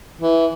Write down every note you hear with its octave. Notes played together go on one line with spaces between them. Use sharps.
E3